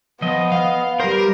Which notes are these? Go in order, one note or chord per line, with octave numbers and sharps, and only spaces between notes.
F3 B3 D#5
F5
G3 A#4 C5